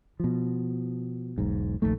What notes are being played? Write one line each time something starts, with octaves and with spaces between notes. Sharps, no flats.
B2 F3
E1 B1 G#2
A#1 D#2 D#3 A3